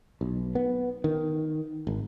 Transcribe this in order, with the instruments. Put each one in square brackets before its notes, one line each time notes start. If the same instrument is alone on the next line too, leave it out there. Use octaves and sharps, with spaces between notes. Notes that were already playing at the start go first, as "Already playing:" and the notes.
[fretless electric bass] B1
B3
D#3
G#1